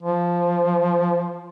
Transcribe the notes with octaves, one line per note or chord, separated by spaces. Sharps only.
F3